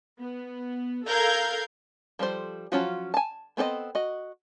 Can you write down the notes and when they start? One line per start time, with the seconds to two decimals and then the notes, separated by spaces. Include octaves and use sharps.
0.19 B3
1.06 A4 A#4 F5 G6 G#6
2.19 F3 G3 A4 C5
2.72 F3 F#3 C#4 F4 F#4
3.14 G#5 A5
3.57 B3 C4 A4 C#5 D#5
3.95 F#4 D#5